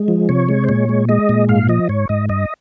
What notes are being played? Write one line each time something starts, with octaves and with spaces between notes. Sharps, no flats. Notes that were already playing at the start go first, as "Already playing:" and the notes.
Already playing: G#3
F3
C3 C#5
G#3
C5
A#2 C#5
G#3
G#3 D#5
A#2
G#2 F5
F3 D#5
G#2 C#5
G#2 D#5
G2 D#5